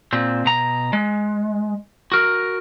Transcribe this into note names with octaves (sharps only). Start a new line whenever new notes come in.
A#2 C4
B2 A#5
G#3
F#4 A#4